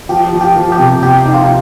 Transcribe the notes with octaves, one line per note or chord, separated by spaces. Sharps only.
F3 G4
F3
G4
F3
G4
C3
C3 G4
D#4
F4